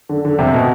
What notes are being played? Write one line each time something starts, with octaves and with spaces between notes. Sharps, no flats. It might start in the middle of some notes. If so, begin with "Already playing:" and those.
D3
D3
C3
B2